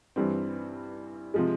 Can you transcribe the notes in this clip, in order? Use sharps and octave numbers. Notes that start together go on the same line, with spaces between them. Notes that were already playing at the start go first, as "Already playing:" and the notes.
G2 E3 G3 C4
C3 F3 G#3